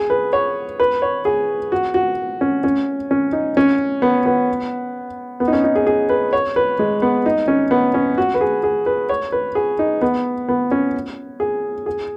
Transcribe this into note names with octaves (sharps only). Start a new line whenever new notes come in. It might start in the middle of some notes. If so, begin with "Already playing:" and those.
Already playing: G#4
B4
C#5
B4
C#5
G#4
F#4
F#4
C#4
C#4
C#4
D#4
C#4
B3
B3
B3
D#4
C#4
D#4
G#4
G#4
B4
C#5
B4
G#3
B3
D#4
C#4
B3
C#4
F#4
B4
G#4
G#4
B4
C#5
B4
G#4
D#4
B3
B3
C#4
G#4
G#4